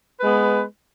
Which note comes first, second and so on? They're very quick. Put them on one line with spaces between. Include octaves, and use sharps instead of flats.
B4 G#3 B3